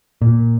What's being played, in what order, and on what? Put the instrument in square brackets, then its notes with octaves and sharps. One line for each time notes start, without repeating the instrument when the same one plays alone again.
[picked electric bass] A#2